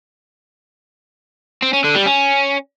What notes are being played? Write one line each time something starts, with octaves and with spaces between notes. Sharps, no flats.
C4
C#4
D3
G3
C#4